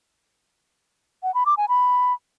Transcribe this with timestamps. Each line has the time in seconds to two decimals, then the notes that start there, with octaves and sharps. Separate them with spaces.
1.23 F#5
1.34 B5
1.46 D6
1.57 G#5
1.69 B5